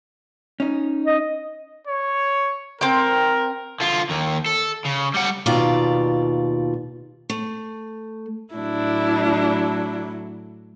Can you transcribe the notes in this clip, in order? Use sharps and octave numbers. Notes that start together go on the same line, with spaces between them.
C#4 D#4
D#5
C#5
C4 A#4 G5
D3 F4
D#2 D#3
A4
C#3
G3 F#5
D#2 B2 F4 D5 A#5
A3
A2 F#3 D4 E4